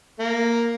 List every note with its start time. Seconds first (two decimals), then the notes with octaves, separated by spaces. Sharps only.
0.19 A#3